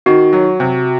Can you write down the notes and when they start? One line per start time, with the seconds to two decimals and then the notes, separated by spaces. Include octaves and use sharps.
0.06 D#3 F#4
0.33 F#3
0.60 C3